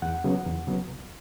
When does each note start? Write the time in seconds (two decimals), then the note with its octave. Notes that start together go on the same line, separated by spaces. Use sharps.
0.02 E2 F#5
0.24 C#3 F#3 B3
0.45 E2
0.67 C#3 F#3 B3
0.89 C2